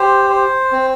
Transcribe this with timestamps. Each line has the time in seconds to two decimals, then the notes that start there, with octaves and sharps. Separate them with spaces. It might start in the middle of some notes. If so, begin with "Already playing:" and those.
Already playing: G4 C5
0.30 C5
0.72 C4